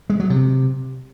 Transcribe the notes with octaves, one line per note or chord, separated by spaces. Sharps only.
G#3
F#3
C3